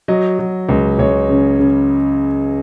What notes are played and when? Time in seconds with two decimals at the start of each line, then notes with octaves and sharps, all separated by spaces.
0.08 F#3 D#5
0.39 F#3
0.69 C#2
0.99 C#2 C#5
1.29 C#3
1.60 C#3